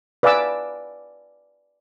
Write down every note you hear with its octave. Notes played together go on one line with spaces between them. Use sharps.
B4 D5 F5 G#5 D6 E6